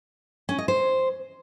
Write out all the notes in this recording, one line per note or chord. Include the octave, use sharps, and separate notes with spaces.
C#4
D#5
C5